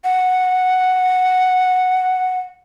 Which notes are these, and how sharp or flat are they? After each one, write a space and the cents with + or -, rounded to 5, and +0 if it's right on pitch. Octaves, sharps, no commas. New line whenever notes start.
F#5 -5